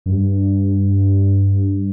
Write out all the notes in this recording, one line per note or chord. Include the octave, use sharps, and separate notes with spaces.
F#2
G2